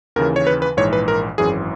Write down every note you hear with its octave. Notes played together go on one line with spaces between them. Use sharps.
D#2 C#3 E3 A#4
C#5
B4
B4
A#1 G#2 E3 C#5
B4
A#4
G#1 F#2 E3 G#4